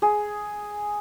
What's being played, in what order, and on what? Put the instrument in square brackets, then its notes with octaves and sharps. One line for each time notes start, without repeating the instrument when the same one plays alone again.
[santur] G#4